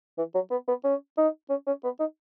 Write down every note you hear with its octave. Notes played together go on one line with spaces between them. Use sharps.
E3
F#3
B3
B3
C#4
D#4
C#4
C#4
B3
D#4